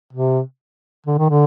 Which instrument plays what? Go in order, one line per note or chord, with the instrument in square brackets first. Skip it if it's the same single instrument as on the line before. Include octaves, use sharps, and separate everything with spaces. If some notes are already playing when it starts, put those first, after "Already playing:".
[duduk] C3
D3
D#3
D3